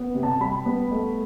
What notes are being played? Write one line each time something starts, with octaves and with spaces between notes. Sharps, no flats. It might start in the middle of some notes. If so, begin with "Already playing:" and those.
Already playing: B3
C3
A5
G3 B5
B3
A3